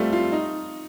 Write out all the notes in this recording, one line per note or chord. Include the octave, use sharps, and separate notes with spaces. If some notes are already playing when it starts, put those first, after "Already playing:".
Already playing: G3 A3 C4 F4
F4
D#4